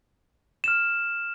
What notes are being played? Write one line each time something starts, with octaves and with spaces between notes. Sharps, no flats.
F6 E7